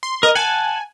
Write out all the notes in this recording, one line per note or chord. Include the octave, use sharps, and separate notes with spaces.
C6
A#4 D#5
F#5 G#5 A5